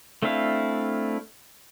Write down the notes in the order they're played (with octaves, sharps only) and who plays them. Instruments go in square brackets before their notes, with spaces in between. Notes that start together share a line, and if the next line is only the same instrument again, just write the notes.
[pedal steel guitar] A3 C4 D4 E4 F5